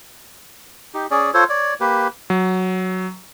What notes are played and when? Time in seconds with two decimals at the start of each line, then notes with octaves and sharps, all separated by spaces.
0.94 D#4 G4
1.11 C#4 G#4 D5
1.34 F4 A4 C5 C#5
1.49 C#5 D5
1.80 A#3 G4 B4
2.30 F#3